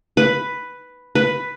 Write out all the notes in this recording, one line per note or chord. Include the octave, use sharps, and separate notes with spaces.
B4
B4